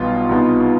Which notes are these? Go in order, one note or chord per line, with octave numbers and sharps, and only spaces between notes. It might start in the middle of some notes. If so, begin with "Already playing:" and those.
Already playing: B1 B2 G3 B3 F4
C2 B2 B3 D#4